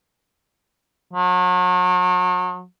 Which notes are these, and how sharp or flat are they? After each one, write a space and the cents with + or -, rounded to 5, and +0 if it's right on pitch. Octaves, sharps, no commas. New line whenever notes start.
F#3 -35